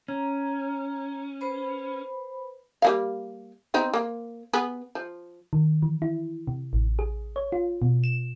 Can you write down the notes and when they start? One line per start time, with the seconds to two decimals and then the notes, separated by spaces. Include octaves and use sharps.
0.08 C#4 A#5
1.41 B4 C5 B5
2.82 G3 A#3 F5
3.74 B3 C4 D#4
3.94 A#3
4.53 B3 G#4
4.95 F3
5.53 D#3
5.82 E3
6.02 E4
6.47 C3
6.73 A1
6.99 G#4
7.36 C#5
7.52 F4
7.82 B2
8.04 E7